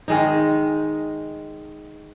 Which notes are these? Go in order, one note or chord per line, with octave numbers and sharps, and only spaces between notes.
D#3 G#3 D#4